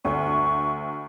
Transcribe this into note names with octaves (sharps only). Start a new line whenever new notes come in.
D2 C#6